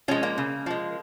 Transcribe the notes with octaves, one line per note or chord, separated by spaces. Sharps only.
F3 G#3 C#4
A#3
C#3
F3 G#3